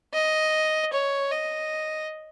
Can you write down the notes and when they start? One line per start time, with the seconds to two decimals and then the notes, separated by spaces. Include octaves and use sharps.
0.13 D#5
0.93 C#5
1.32 D#5